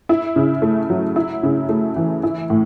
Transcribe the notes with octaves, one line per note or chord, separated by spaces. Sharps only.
E4
C#3
A3
F#3
E4
C#3
A3
E3
E4
A2